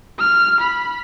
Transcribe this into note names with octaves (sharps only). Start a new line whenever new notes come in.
F6
B5